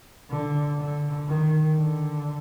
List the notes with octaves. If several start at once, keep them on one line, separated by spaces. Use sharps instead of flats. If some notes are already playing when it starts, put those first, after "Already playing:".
D3
D3
D#3
D3